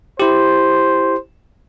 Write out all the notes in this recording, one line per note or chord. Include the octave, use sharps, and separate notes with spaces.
E4 G4 C5